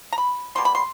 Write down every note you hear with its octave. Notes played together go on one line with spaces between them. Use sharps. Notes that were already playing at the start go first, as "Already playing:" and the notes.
A#5
B5
B2 G3 A#3 C6
B5
C6